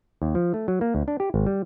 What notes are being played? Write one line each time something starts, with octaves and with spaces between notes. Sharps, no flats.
D#2
F3
A3
F#3
A#3
D2
D4
G4
G#1
G3